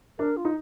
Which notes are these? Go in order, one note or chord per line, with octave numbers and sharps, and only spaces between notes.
D4 A#4
F4
D#4